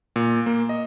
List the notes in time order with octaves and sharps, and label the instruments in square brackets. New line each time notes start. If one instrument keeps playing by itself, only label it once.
[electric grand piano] A#2
A#3
D#5